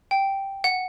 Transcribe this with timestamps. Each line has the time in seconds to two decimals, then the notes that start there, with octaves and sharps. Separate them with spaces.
0.11 G5
0.64 F#5